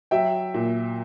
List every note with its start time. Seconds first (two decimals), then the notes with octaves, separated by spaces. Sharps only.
0.11 F#3 E5 G5
0.54 A#2